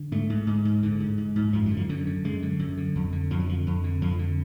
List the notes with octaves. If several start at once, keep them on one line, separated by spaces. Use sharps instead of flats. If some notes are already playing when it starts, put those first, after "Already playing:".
Already playing: D3
G#2 A3
G#2
G#2
G#2
G#2 D3
G#2
G#2
G#2
F#2 F3
F#3
D3
F3
F#2 D3
D3
F#2 G#3
D3
F#2
D3
F2
D3
F2 F3
F#3
D3 F3
F2
D3
F2 F3
D3